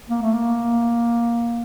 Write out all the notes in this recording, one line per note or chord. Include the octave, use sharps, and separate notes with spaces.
A#3
A3
A#3